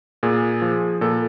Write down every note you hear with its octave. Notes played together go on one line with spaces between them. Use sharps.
A#2 G#4
F3
A#2 A4